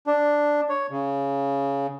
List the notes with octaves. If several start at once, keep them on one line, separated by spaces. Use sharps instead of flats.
D4
C#5
C#3